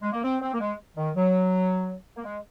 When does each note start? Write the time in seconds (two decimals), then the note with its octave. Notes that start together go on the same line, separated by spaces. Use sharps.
0.02 G#3
0.13 A#3
0.24 C4
0.42 C4
0.53 A#3
0.61 G#3
0.97 D#3
1.16 F#3
2.17 A#3
2.25 G#3